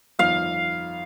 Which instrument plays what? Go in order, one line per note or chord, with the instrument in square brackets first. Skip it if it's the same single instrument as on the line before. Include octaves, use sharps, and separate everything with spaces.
[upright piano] G1 F2 D#3 [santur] F5